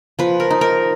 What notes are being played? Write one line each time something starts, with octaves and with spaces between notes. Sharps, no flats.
F3 B4
A#4
D#4
A#4